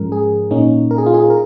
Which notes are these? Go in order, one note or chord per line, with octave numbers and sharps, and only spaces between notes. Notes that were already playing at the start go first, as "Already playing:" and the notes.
Already playing: G#2 F3 G#3 C#4 A#4
G#4
A#2 A#3 C#4 D#4
A#4
G#4
F4
G#4
A#4